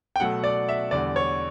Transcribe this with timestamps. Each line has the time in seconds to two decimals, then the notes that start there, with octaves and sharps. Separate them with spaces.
0.16 G5
0.20 B2 F#3 A3 F#5
0.44 D5
0.68 E5
0.91 E2 D3 G3 D5
1.16 C#5